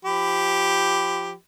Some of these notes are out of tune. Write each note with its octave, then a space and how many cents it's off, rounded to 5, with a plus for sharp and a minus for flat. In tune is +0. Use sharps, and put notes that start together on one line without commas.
F3 +0 G4 +0 B5 +15